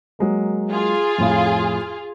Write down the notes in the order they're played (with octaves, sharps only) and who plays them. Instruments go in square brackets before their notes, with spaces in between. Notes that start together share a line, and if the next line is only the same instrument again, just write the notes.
[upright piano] F#3 G#3 A#3
[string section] F4 G#4
[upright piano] F2 A2 F5